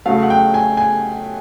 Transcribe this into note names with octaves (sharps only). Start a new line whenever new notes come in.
C#3 F#3 A3 F5
F#5
G5
G#5
G#5